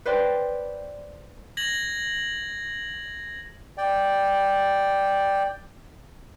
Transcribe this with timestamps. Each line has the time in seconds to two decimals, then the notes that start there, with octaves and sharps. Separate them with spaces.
0.06 B4 C5 D5 G5
1.57 G#6 A#6 F#7
3.77 D5 G5